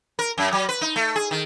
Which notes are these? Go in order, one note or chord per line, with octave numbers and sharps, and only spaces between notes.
A#4
F#2
F#3
B4
D#4
A3
G#4
D#3